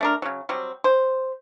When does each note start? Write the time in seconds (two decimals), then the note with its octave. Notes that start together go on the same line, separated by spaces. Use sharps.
0.01 A3 D4 A#4
0.22 C#3 F#3
0.49 F#3 G3 C4
0.84 C5